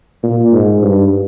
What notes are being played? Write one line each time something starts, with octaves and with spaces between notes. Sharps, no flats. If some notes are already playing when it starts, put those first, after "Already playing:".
A#2
G#2
G2